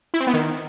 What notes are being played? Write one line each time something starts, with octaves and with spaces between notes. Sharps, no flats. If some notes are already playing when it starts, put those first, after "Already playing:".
E4
C4
B3
D#3